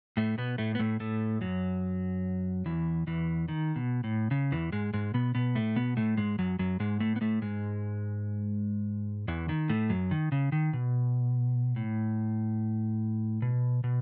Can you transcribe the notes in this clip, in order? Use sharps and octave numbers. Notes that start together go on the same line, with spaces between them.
A2 A3
B2 B3
A2 A3
B3
A2 A3
A2 A3
F#2 F#3
E2 E3
E2 E3
D#3
B2
A2
C#3
E2 E3
G#2 G#3
G#2 G#3
B2 B3
B2 B3
A2 A3
B2 B3
A2 A3
G#2 G#3
F#2 F#3
F#2 F#3
G#2 G#3
A2 A3
B3
A2 A3
G#2 G#3
E2 E3
D#3
A2 A3
F#2 F#3
D#3
C#3
D#3
B2
A2
B2
B2